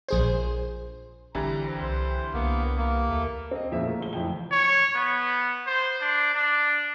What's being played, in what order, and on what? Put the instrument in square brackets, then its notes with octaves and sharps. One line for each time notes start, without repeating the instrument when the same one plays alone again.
[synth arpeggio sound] A#1 G#4 C5
[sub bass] A1 [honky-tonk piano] D3 E3 G3 [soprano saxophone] A#5
[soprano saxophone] C4
[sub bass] C2 [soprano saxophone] C5
[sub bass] C2 [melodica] A#3 [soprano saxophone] B3
[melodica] A#3
[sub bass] D#2 [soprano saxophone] A3
[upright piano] C4 D#5
F2 A#2 C#4 G#4 C#5 E5
A3 A#3
A#1 G7
F#1 F2 E3 G5 G7
[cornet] C#5
B3
C5
D4
D4